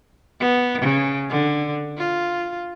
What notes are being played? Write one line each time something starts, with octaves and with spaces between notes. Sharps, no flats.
B3
C#3
D3
F4